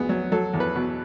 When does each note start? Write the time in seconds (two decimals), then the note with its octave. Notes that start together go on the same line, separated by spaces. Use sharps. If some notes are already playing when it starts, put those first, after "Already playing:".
Already playing: D2 B3 G#4
0.09 F#3
0.32 F#3 A4
0.54 E2
0.60 B4
0.76 B2